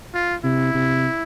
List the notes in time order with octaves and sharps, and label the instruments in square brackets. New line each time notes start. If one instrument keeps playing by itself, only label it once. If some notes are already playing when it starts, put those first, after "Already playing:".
[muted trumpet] F4
[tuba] C3 [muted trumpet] E4
[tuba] C3